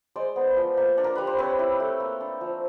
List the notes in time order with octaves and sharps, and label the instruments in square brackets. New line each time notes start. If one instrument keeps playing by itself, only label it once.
[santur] G#3 C5 D5
B3
F3
A#3
D4
A#4
G3 B4
C5
C4 B4 C#5
E4
A3
A#3
D4
F3